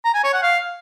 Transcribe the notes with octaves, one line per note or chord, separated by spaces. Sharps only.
A#5
G#5
C#5
F#5
F5